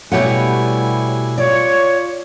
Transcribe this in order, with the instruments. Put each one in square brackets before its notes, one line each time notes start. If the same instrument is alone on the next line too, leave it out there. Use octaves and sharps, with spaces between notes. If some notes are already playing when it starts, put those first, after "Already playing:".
[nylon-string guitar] B2 A3 [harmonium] G3 E4 G#5 [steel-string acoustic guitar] G4 C#5 F#5
[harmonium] F4 [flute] C#5 [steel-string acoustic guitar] D5